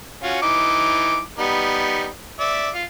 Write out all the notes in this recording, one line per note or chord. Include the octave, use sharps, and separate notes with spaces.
C#4 F4 F#4
E3 D#4 D6
G3 B3 D#4
D5 E5
F4 F5